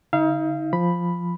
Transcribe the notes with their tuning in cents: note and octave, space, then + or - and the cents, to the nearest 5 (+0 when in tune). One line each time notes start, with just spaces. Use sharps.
D3 -30 D#4 +35 F5 -25
F3 +0 B5 +0